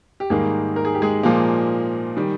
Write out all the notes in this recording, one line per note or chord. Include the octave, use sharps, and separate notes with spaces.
G4
G#2 D#3 G3 G#3 A#3 G#4
A#4
G#4
G4
G#3 G#4
A#2 F3 A#3
D#3 G3